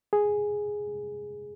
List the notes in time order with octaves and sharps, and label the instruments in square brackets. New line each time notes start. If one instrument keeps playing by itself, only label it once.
[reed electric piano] G#4